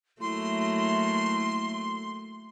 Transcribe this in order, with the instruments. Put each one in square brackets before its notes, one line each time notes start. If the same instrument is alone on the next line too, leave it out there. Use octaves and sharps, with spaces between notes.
[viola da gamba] F#3 A3 A#3 [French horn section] E4 [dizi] C6